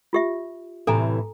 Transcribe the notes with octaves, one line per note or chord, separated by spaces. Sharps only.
F4 G4 E5
A2 C3 E3 A4 G#5 A#5